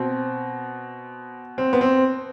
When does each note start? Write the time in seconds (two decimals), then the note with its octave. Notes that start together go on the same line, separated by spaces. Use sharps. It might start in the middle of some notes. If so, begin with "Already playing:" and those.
Already playing: B2 C4
1.58 C4
1.73 B3
1.81 C4